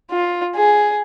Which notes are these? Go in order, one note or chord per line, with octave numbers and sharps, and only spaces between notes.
F4
G#4